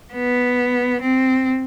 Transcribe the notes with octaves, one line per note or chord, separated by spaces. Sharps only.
B3
C4